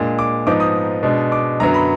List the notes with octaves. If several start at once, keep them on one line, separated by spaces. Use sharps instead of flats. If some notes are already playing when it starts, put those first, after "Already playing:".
Already playing: A#2 G#3 D4
D6
G#2 F3 B3 D#4 D6
D#6
B2 G#3 D4
D6
F#2 D3 F#3 B3 A#5
B5